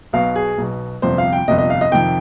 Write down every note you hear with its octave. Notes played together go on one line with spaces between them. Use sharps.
B1 B2 F5
G#4
B1 B2
G1 F2 C3 C5
F5
G5
G1 F2 C3 D#5
D#5
F5
D#5
F2 C3 D#3 G5